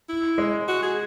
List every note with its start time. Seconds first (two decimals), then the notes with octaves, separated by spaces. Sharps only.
0.09 E4
0.38 G#3
0.68 F#4
0.83 G#4